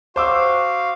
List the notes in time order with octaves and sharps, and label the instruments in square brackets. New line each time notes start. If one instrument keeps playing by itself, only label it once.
[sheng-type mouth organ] F#4 F5 [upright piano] C5 D6 E6